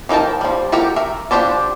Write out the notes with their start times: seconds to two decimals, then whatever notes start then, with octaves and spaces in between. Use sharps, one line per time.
0.09 E3 D#4 A#4 G5 A5
0.41 F3 G3
0.72 F#4 G4 A4 A#4 G5
0.96 A#4 E5
1.31 F3 D4 G4 C5 D5